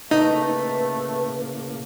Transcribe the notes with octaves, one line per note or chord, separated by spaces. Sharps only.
A2 C#3 A3 A#3 D#4 B4